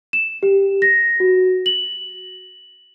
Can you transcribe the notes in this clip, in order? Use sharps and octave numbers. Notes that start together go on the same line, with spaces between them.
E7
G4
A#6
F#4
F#7